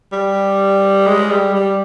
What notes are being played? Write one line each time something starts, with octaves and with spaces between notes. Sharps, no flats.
G3
G#3
G3
G3